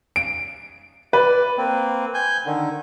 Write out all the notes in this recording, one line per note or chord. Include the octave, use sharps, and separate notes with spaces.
D7
B4 D5
A#3 C4
G#5 G6
D3 D#3